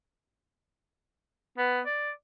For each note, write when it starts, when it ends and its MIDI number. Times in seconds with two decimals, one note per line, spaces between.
1.58 1.81 59
1.86 2.11 74